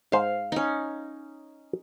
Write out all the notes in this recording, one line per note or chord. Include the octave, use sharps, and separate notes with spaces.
G#2 C5 F5
C#4 D#4